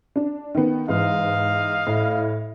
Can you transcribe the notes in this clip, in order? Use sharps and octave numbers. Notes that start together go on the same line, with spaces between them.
D4
D#3 B3
G#2 E3 D#5 F5
A2